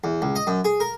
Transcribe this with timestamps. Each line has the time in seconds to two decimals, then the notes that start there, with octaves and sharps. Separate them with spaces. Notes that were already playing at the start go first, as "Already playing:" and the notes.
0.04 E2
0.22 C#2
0.36 D#5
0.47 F#2
0.65 G#4
0.80 A#4